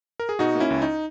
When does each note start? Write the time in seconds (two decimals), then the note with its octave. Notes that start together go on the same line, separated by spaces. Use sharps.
0.20 A#4
0.29 G#4
0.39 B2 D#4 F#4
0.55 A#3
0.60 C#4 E4
0.70 C#2
0.82 D#4